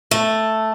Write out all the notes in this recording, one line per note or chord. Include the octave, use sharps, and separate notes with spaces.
A3